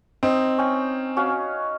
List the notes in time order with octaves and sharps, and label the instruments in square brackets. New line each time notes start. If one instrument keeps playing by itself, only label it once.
[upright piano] C4 [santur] D#4
[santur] C#4 G5
C#4 F#4 F5